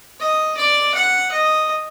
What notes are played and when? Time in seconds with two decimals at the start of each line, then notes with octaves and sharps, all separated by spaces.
0.20 D#5
0.57 D5
0.95 F#5
1.32 D#5